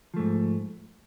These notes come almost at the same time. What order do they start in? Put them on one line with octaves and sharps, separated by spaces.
F3 A3 G#2